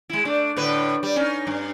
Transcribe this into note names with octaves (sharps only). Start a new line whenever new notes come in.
G#3 E4
A3 D4
A2 D3 B4
G3
C#4 D#4
G2